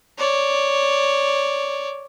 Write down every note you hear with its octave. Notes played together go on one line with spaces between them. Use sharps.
C#5 D5